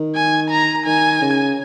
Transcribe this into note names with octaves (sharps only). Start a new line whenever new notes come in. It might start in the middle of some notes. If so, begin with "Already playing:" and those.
Already playing: D#3
G#5
A#5
D#3 G#5
C#3